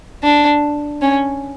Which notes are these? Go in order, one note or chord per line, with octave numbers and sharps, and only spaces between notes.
D4
C#4